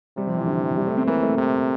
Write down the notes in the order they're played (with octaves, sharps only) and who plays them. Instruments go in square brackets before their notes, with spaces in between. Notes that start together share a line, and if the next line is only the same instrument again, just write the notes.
[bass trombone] C3 [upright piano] G3
[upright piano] F3
E3
D3
E3
G3
A3
C4
[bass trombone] E3 [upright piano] A#3
[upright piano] A3
[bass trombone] C3